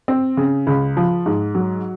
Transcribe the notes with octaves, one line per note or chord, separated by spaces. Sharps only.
C4
C#3
C#2
F3
G#2
F#3